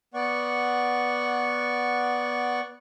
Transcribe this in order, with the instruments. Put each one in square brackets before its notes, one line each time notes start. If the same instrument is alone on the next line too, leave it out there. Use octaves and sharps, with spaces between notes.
[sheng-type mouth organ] B3 D5 F#5 C#6